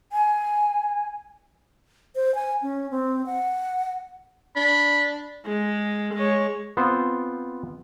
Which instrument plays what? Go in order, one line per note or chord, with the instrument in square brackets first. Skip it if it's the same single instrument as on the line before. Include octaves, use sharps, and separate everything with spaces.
[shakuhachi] G#5
[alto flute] C5
G#5
C#4
C4
F#5
[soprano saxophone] D4 [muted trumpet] B5
[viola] G#3
G#3 C#5
[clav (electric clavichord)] B3 C4 F4 C5